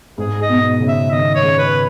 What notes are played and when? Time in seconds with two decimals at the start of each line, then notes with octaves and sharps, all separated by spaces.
0.18 G#2 G#4
0.42 D#5
0.49 B2
0.80 C#3
0.88 E5
1.11 D#3 D#5
1.35 C#5
1.43 C#3
1.58 B4